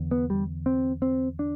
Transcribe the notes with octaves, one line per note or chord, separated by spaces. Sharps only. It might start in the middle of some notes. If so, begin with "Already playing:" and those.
Already playing: E2 D3
B3
G3
C4
C4
D4